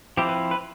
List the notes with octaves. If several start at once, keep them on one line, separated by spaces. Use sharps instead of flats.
F3 C4 E4 G4
B4
B4